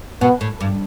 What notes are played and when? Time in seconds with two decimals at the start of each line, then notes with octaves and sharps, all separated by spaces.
0.21 B2 B3
0.41 A2
0.61 G2